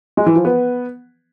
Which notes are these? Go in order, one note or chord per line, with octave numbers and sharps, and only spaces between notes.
G#3
E3
F3
B3